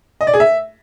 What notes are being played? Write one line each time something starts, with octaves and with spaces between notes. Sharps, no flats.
D#5
D5
G#4
E5